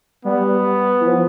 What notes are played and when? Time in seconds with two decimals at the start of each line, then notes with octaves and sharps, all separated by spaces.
0.24 G3 B3
1.00 E3
1.07 F3